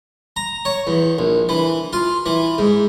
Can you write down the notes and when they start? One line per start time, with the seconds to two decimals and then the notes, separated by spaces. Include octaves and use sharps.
0.36 A#5
0.65 C#5
0.87 E2
1.19 A#1
1.49 E3
1.93 F4
2.26 E3
2.58 G#2